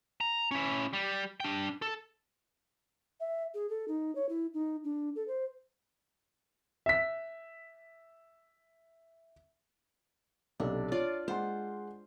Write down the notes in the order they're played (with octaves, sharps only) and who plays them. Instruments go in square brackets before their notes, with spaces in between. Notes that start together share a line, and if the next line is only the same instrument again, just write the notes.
[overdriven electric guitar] A#5
C#4 E4
G3
D4 G5
A4
[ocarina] E5
G#4
A4
D#4
C#5
E4
D#4
D4
A4
C5
[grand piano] E5 B6
[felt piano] B1 C3 A4 [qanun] D4
[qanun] F4 D5 [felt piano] C#5
[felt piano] G#3 F#5 C6 [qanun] C5